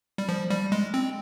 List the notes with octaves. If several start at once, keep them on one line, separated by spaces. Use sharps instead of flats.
G3
F3
G3
G#3
C4